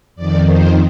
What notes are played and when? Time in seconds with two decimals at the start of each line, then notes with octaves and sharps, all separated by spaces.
0.16 F2 D#3 D5
0.46 C5